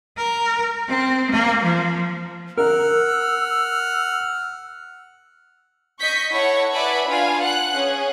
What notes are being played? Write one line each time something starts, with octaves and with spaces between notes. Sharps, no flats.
A#4
C4
A#3
F3
A#4 F#5 E6 F6
D#5 C#6 G6 B6
E4 A4 C#5 F#5 C#6
B4 D5 E5 F#5 G#5 B5
D4 F4 B4 F5 G#5
F#5 F#6
C#4 G#4